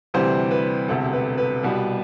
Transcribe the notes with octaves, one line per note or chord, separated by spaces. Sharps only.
D2 C3 E3 G3 C5
B4
E1 D2 C3 A4
B4
B4
C2 B2 G3